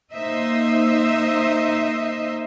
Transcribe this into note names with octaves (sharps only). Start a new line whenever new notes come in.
A#3 D#4 C5 D#5 E5